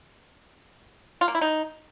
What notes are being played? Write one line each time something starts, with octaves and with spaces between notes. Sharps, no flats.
F4
A#3
E4
D#4